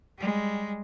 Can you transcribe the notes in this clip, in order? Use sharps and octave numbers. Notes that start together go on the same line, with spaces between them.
G3 G#3